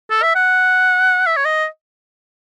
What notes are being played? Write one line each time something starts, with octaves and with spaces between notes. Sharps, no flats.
A4
E5
F#5
E5
C#5
D#5